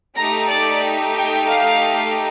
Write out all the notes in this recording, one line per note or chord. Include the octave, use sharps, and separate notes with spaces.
A3 D#4 G4 A#5
D5
G5
F5